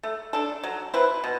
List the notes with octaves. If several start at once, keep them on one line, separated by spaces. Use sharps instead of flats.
A3
D4 A4
F#3
C4 E4 B4
B2